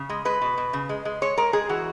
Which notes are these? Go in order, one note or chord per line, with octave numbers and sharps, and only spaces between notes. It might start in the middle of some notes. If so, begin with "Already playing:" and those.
Already playing: C#3
G#3
G#3 B4
B2
B2
C#3
G#3
G#3
G#3 C#5
G#3 A#4
G#3 G#4
E3 F#4